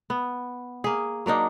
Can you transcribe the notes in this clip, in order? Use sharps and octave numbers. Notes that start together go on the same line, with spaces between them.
B3
A#3 G#4
F#3 A#3 D4 D#4